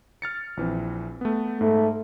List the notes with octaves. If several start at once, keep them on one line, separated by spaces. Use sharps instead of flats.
F6 A6 C#7
A#1 E3 C4
A3 B3
G#2 A3